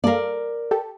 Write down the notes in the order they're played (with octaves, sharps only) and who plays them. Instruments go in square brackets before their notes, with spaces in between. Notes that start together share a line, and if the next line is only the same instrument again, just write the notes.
[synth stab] A#3 A4 F5 [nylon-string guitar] A#4 D5
[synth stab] G4 A4